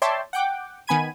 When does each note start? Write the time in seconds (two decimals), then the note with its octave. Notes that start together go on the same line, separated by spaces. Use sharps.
0.02 C#5 D5 E5 G5 A5 C6
0.33 F#5 G5 D6
0.87 D#3 B3 G#5 B5 G#6 D#7